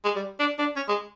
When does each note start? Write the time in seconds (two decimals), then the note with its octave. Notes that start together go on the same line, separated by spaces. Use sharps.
0.04 G#3
0.15 G3
0.39 D4
0.59 D4
0.76 C#4
0.88 G#3